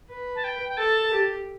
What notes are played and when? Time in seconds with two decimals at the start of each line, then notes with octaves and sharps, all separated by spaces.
0.11 B4
0.36 A5
0.44 G5
0.69 G5
0.77 A4 A5
1.11 G4